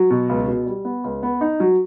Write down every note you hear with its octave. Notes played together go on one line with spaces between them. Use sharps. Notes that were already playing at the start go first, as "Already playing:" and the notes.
Already playing: F#3
B2
C#2
B2
G3
B3
C#2
B3
D#4
F#3